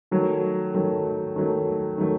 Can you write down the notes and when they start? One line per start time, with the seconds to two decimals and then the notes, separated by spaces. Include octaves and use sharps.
0.11 D#3 F#3 A3
0.74 D#3 F#3 A3
1.36 D#3 F#3 A3
1.98 D#3 F#3 A3